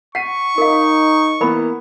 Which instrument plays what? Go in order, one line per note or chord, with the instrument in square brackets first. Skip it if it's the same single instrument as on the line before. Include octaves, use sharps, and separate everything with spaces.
[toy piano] F#5 [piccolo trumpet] C#6 [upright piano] B6 C7 D#7
[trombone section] D#4 [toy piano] A#4 F5
[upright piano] E3 A#3 B3 [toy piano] A#4 B5